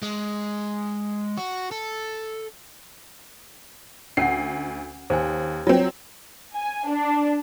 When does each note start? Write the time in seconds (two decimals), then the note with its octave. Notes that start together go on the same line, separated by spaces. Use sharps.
0.02 G#3
1.37 F#4
1.71 A4
4.17 D2 C#4 F#5 C7
5.10 D#2 C5 G#5
5.67 F#3 C4 F4 C#5
6.54 G#5
6.88 D4